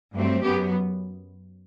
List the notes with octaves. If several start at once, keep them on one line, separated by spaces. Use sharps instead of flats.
G2 F#3 A3 C4
F#2 F#3 B3 G4